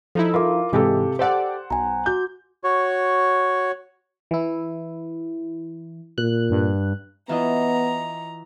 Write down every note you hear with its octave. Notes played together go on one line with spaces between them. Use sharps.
F3 D#4 E4 A4
F4 A#4 F5 D6
G#2 C3 E3 G#3 G4 A4
G4 A4 C5 D5 F#5
B1 G#5 A#5
F#4 D6 G6
F#4 C#5
E3 E4
A#2 F#6
G2
E3 B3 F4 D#5 A#5